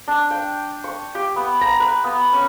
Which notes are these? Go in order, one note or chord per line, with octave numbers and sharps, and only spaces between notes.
D4
G5
C#6
G4
B3
A#5
B4
B3
C#4